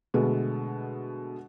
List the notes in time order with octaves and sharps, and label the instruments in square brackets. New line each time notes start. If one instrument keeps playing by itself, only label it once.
[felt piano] B2 D3 G#3 A3 B3